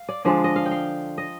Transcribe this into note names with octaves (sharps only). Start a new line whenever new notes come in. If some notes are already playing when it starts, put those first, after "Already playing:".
Already playing: F5
D5
D3 F3 G#3 D5
D#5
F5
G5
F5
D#5